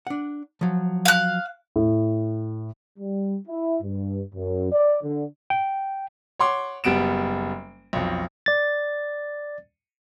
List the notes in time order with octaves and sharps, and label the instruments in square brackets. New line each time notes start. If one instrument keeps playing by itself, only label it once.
[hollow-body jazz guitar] D4 F#5
F3 F#3
[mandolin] F5 F#6
[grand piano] A2
[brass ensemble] G3
E4
G2
F#2
D5
D3
[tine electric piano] G5
[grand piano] C#5 F#5 C6 D6
F#1 G3 B3 D7 E7
B1 F2
[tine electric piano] D5 A6